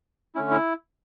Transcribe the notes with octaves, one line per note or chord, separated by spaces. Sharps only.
D3 A3 C#4 E4
E4